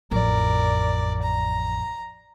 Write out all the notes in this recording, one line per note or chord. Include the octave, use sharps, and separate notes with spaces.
A1 F2 A#4 D5
A#5